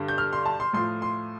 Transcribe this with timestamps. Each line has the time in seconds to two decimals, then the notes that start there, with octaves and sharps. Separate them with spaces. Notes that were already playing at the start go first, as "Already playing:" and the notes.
Already playing: G2 D3 G3
0.08 G6
0.18 F6
0.33 C6
0.45 A5
0.60 C6
0.73 A2 F3 C6
1.02 C6